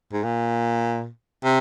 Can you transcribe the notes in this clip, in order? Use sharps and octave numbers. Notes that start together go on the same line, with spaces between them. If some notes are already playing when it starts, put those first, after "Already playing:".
G#2
A#2
C3